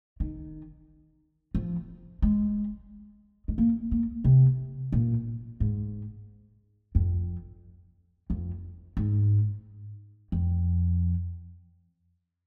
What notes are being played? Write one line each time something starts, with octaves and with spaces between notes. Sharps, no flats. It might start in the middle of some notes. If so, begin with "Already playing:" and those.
D#3
F3
G#3
G#3
A#3
A#3
C3
A#2
G#2
F2
F2
G#2
F2